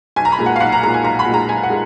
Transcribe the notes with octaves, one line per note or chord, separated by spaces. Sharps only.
B1 G#5
A#5
B5
A#2 G#3
F#5
F5
B1 F#5
A#5
A#2 G#3 A#5
G#5
B1 A#5
B5
A#2
G#3 A#5
B1 G#5
F#5
G#3